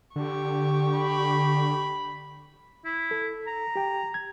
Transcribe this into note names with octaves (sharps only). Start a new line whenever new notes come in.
D3 G4 C#6
B5
E4
A4
A#5
G4 G5
G#6